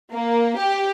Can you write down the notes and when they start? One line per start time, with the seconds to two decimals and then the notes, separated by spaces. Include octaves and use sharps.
0.12 A#3
0.59 G4